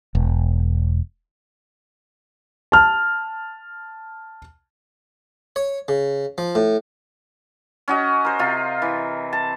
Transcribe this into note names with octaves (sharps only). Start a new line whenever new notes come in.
E1
A5 F6
C#5
C#3
F3
A2
C#4 F#4 D#5
A#4 C5
C3 F4
E3
A5